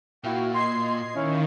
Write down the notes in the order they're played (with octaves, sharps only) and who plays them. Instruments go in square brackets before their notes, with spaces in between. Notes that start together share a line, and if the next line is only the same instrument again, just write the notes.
[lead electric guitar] A#2 [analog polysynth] E4 F#4 F5 [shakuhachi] G5
[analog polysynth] D#5 G#6 C7 [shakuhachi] C6
[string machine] D#3 [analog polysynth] C#4 E4 F5 [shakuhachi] C#5